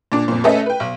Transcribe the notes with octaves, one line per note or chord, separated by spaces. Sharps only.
A#2 D4
F2 A#2
A3 C#4 A4 B4 D#5 E5
B4 G5
B1